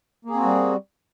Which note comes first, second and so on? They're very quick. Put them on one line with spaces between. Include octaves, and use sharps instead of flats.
A#3 G#4 C4 F#4 G3